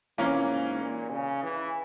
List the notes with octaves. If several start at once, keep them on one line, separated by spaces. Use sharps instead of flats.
C3 E3 A#3 C#4 F4 A#4
G#2
A#2
C#3
E3